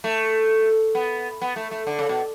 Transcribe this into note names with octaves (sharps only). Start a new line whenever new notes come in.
A3
B3
B3
A3
A3
D3
C#3
B2